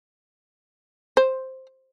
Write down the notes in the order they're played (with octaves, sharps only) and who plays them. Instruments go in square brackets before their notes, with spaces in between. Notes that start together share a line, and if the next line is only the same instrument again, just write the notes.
[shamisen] C5